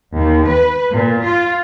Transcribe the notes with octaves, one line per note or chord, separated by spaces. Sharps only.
D#2
B4
A#2
F4